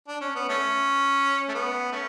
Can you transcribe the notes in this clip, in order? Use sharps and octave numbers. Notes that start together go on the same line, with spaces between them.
D4
C#4
B3
A3 C#4
A3
B3
A3 C#4